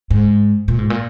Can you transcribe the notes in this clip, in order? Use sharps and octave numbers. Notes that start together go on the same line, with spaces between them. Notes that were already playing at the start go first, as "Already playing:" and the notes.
G#2
A#2
G#2
A#2